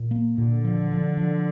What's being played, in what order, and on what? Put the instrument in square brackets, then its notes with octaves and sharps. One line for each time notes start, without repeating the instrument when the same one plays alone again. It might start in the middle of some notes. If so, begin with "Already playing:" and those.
Already playing: [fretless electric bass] A#2
A#3
[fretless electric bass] A#2 [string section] D3
[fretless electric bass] F3
F3
F3